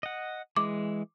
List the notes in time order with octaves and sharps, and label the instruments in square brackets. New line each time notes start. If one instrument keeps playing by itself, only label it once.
[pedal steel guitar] D#5 F#5
[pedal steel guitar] E3 G#3 [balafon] D6